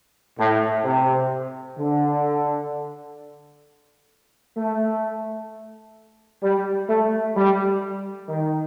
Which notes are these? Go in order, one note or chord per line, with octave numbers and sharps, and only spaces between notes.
A2
C3
D3
A3
G3
A3
G3
D#3